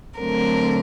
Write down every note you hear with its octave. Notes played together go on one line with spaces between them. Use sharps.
D3 F#3 A3 C4 A#4